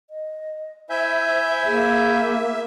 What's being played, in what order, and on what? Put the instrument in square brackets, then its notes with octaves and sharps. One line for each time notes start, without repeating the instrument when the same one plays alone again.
[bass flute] D#5
[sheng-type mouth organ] E4 G#5 G6 [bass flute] C5 [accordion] E5
[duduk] A#3 [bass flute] G#4